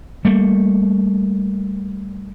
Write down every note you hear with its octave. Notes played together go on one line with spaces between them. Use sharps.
G3 A3 A#3